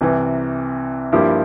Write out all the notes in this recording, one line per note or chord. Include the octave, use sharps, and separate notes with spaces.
C2 C3 E3
G2 F3 A#3 E4 G4